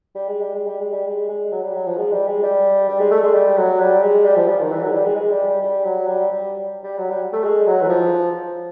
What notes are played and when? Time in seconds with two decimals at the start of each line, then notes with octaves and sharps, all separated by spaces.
0.15 G3
0.28 G#3
0.41 G3
0.54 G#3
0.66 G3
0.80 G#3
0.93 G3
1.06 G#3
1.29 G#3
1.52 F#3
1.64 G3
1.74 F#3
1.86 F3
1.97 G#3
2.12 G3
2.27 G#3
2.43 G3
2.88 G3
3.00 G#3
3.11 A3
3.23 G#3
3.34 G3
3.57 F#3
3.80 G3
4.02 G#3
4.25 G3
4.36 F3
4.48 G3
4.59 D#3
4.71 E3
4.82 F#3
4.88 G#3
4.93 G3
5.05 G#3
5.16 G#3
5.31 G3
5.47 G3
5.62 G3
5.84 F#3
6.07 G3
6.30 G3
6.83 G3
6.98 F#3
7.10 G3
7.33 A3
7.44 G#3
7.67 F#3
7.82 E3
7.89 F3